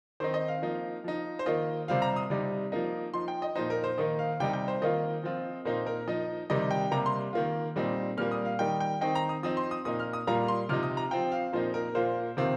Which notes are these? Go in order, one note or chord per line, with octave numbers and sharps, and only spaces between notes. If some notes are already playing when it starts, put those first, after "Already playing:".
D#3 C4 D#4 C5
D#5
F5
F3 A#3 D#4
F3 D#4
C5
D#3 A#3 F4 D#5
C3 G3 C4 F4 F5
A#5
D#6
C3 G3 D#4
F3 A#3 D#4
F3 D#4 C6
G5
D#5
A#2 F3 D#4 C5
A#4
C5
D#3 A#3 D#4 D#5
F5
C3 G3 D#4 G5
G5
C5
D#3 A#3 F4 D#5
F3 C4 F4
A#2 A#3 D#4 C5
A#4
F3 D#4 D#5
C3 D#3 G3 D#4 D#5
G5
C3 G3 A#3 A#5
C6
D#3 A#3 F4
A#2 G3 C4 D#4
A#2 G3 A#3 F6
D#6
F5
D#3 G3 D#4 G5
G5
D#3 C4 D#4 G5
A#5
D#6
F3 C4 D#4 D#6
C6
D#6
A#2 A#3 D#4 D#6
F6
D#6
A#2 G3 A#3 F4 A#5
C6
C3 F3 D#4 F6
D#6
A#5
F3 C4 F4 G5
F5
A#2 F3 A#3 D#4 C5
A#4
A#2 A#3 F4 C5
C3 D#3 C4 F4